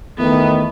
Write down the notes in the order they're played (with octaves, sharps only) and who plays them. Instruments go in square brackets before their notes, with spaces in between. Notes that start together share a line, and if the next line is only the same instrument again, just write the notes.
[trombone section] E2 D#3 A3 [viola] B3